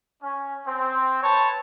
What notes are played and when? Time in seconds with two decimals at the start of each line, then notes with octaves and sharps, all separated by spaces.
0.21 C#4
0.67 C4
1.23 B4 C#5 A5